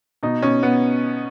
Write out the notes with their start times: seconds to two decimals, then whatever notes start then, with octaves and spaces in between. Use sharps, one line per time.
0.23 B2 D#4
0.42 B2 C#4
0.62 B2 B3